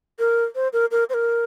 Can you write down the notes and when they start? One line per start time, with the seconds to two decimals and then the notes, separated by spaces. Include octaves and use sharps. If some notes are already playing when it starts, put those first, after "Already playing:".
0.19 A#4
0.55 C5
0.73 A#4
0.91 A#4
1.10 C5
1.14 A#4